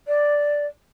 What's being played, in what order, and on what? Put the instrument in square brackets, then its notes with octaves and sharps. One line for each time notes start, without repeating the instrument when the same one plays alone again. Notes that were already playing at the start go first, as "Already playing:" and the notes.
[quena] D5